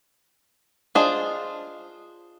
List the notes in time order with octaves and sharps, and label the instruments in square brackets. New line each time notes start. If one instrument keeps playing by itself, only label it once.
[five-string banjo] D4 F4 G#4 C5 D#5